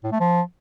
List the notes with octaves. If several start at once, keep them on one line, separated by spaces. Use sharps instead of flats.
A2
A3
F3